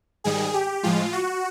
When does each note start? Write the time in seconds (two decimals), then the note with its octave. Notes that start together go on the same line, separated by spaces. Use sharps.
0.24 G#2 D#3 G3 G#4
0.54 G4
0.83 A2 F3 G#3 F4
1.13 F#4